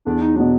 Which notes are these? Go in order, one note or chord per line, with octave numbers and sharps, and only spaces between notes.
E2 D4
D#4
B2 F#3 D4